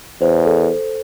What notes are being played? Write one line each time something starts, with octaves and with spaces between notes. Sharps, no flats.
E2 C5
A4